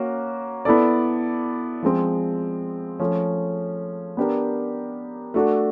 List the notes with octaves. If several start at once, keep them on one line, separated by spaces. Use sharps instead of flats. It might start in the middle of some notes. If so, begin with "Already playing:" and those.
Already playing: A#3 C#4 F#4
B3 E4 A4 D5
F3 G#3 C4
F3 A3 C#4
B3 D4 G4 A#4
A3 D4 F#4 A4